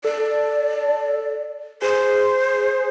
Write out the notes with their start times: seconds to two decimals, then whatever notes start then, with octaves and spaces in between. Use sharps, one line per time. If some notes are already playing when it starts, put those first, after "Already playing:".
0.04 A4 D5
1.82 G#4 C5